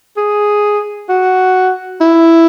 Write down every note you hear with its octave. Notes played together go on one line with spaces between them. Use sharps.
G#4
F#4
E4